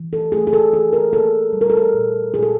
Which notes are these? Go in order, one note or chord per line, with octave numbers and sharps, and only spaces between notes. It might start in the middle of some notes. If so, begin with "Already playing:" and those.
Already playing: E3
A4
A3 G#4
G#4
A4
E3 G#4
A#4
A#3 A4
G3
A#4
A4
A#4
A#2
A#2 G#4
A4